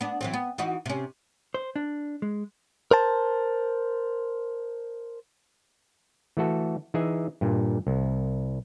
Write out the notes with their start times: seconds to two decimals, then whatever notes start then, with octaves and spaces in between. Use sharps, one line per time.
0.01 B3 D4
0.21 E3 F#3 C4
0.33 B3
0.58 E3 D#4 F#4
0.86 C3 C#4
1.54 C5
1.76 D4
2.22 G#3
2.91 A#4 C5 A5
6.37 E3 A3 F#4 A4
6.94 E3 D#4 G#4 E5 G#5
7.41 G2 A#2
7.87 C2